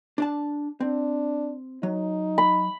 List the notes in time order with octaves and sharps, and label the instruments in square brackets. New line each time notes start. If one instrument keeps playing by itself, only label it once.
[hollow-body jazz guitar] D4 D5 A5
[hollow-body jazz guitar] C4 [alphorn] D4
[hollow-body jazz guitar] F#3 [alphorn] D#4
[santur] B5